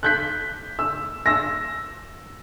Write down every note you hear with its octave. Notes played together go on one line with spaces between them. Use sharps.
F#6 G6 B6
E6
E6 A#6